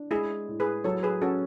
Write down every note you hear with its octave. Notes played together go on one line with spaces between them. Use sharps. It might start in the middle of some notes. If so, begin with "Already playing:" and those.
Already playing: D4
G#3 E4 G#4
A2
G#4 B4
F#3 A4 C#5
G#4 B4
C#4 F#4 A4